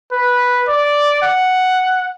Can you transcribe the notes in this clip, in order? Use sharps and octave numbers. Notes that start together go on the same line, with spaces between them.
B4
D5
F#5